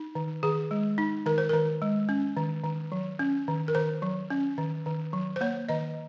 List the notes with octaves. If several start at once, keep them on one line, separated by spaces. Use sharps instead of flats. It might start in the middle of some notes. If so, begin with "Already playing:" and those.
Already playing: D#4
D#3
D#3 G#4
G#3
D#4
D#3 A#4
C5
D#3 A#4
G#3
C#4
D#3
D#3
F#3
C#4
D#3
A#4
D#3 C5
F#3
C#4
D#3
D#3
F#3
C5
A#3 C#5
D#3 D#5